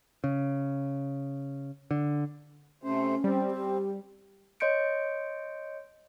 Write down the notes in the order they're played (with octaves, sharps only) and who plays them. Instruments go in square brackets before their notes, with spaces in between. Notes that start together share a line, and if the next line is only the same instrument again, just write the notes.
[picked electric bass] C#3
D3
[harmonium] C3 A3 C5 [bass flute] C#4
[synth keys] G3 [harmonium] C4
[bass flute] G4
[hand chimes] C#5 D#5 C6 G6 C#7 D7